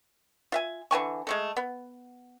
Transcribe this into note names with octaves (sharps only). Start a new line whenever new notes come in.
F4 E5 G#5
D3 E3 G#5 C#6
G#3 A3 A4
B3